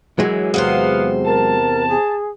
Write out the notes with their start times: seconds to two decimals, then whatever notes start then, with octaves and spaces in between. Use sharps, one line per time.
0.19 F#2 E3 F#3 G#3
0.54 E2 C3 B3 C5 F5
1.25 A#4 A5
1.88 G#4